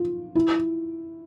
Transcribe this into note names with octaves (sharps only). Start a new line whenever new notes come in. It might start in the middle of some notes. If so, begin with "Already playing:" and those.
Already playing: F4
E4